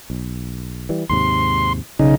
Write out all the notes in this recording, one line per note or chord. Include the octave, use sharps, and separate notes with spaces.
B1
E3 G3
D#2 G#2 C3 C6
B1 C#3 D#4